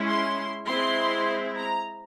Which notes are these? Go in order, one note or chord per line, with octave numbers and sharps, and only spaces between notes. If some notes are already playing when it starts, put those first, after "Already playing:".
Already playing: G#3 C#4 E4
C6
G#3 C4 E4 C6
A#5